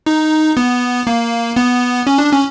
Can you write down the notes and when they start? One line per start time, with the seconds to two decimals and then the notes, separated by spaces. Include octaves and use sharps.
0.06 D#4
0.57 B3
1.07 A#3
1.56 B3
2.07 C#4
2.18 D4
2.32 C#4